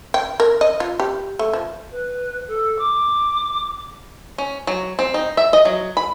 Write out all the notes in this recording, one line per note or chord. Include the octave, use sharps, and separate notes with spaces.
G5
A#4
D#5
F4
G4
A3
F3
B4
A4
D6
C#4
F#3
C4
D#4
E5
D#5
F#3
B5